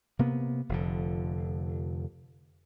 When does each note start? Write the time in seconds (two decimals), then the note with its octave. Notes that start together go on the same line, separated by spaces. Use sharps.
0.19 C3 A#3 B3
0.69 F1 F2 D3